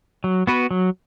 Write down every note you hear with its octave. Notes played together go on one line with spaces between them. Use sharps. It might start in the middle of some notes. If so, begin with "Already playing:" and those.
F#3
B3 F#4 B4
F#3